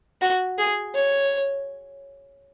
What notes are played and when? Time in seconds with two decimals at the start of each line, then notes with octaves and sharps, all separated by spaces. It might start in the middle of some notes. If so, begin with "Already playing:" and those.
0.21 F#4
0.58 G#4
0.95 C#5